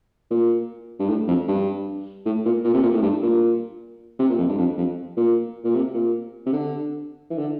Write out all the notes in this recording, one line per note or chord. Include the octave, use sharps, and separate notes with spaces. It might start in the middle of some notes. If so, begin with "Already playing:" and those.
A#2
G2
A2
F2
G2
A2
A#2
A#2
C3
A#2
A2
G2
A#2
C3
A#2
F2
G2
F2
F2
A#2
A#2
C3
A#2
C3
D3
E3
D3